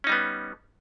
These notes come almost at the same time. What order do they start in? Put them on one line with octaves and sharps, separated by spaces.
C#4 D#4 G3 B3